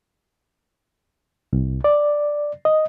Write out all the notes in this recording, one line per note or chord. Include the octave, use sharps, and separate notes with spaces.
C2
D5
D#5